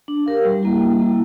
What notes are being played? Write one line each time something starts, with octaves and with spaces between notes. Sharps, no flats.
D4
G4 A#4 F5
G3
A#3 E4
G3
A#3 E4